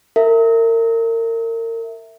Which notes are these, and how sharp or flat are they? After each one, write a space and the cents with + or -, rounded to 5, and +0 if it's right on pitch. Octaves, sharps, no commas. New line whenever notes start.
A#4 -35 E5 +0